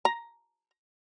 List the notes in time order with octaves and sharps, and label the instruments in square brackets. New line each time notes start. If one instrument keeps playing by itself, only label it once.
[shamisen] A#5